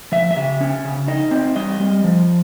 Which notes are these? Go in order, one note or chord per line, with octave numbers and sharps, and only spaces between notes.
F3 E5
E5
C#3
C#4
C#3
D#4 D#5
C4
G3 D#5
G3
F3